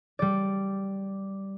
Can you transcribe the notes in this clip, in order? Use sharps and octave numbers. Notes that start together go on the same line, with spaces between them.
G3 D5